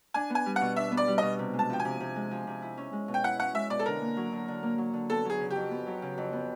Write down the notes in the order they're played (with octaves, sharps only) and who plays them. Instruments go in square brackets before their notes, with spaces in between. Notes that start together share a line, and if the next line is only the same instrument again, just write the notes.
[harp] D4 [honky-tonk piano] G#5
[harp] B3 [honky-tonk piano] G#5
[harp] G3
[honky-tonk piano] F#5
[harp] B2
[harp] D4 [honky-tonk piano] E5
[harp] B3
[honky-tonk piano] D5
[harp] G3
[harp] B2 [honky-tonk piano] D#5
[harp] C3
G#3
[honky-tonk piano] A5
[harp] F3 [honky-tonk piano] G5
[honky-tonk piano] G#5
[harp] C3
C3
G#3
F3
C3
E4
C#4
G#3
B2
[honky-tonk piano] G5
[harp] E4 [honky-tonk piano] F#5
[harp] C#4 [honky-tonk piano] F#5
[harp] G#3 [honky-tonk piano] E5
[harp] B2 [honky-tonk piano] D5
[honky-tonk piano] A4
[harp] D3 [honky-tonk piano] A#4
[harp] A#3
F#3
D3
D3
A#3
F#3
D3
[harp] B3 [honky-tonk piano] A4
[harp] F#3 [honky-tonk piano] G#4
[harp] C#3
[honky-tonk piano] G4
[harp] F2
B3
F#3
C#3
F2
B3